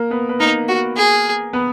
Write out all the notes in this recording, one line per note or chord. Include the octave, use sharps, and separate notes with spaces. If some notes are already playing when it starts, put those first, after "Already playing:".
Already playing: A#3 A#4
B3 B4
B4
A#3 D#4 A#4
F#4
G#4
B3 B4